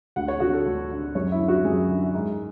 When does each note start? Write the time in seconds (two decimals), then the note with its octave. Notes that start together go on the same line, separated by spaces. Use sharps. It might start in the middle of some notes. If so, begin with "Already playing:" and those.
0.16 D2 F#5
0.28 C#5
0.40 D3 F#4
0.53 A4
0.66 D2
0.91 D3
1.15 F#2 C#5
1.32 E4
1.39 D3
1.48 F#4
1.65 F#2 G#4
1.89 D3
2.14 G#2